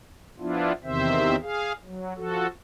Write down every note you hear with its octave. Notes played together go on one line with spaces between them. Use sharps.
F3 B3 D4 E4 F4
E2 C3 D#3 C4 C5 E5
G#4 F5
F#3
F3 F#4 A4